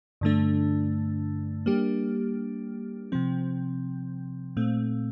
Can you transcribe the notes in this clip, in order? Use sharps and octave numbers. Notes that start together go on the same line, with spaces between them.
G2 D3 A3 D4
G3 A#3 D4 G4
C3 F3 C4
A#2 A3 C4